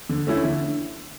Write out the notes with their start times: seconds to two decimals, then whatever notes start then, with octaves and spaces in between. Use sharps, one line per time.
0.09 D3
0.27 A3 C#4 E4
0.44 D3